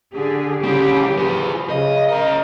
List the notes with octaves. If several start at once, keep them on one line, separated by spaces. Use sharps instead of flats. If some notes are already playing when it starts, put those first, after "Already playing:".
D3 G4 G#4
C#3 G3 C4 G4
F3 G#4 B4
C#3 D#5
C#4 A#4 D#5